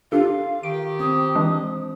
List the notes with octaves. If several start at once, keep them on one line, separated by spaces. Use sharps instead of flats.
D4 F4 G4 A4 F5
D#3 G4 D7
C4 D#6
E3 G#3 D4